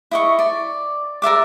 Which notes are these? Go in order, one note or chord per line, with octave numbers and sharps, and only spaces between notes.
E4 D#5 C#6
D5
A#4 D5 E5 D6